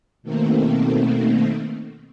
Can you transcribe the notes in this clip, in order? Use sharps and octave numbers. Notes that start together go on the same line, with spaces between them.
B2 D#3 A3 A#3 C4